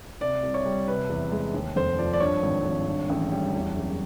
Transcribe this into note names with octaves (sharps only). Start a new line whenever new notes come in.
C3 D5
C2
C#5
G3
C3 B4
E2
G#3
D#2
F1 C5
F3 D5
D5
G2 C#5
G#1
G#1
G2
A1
G3
E2
F#1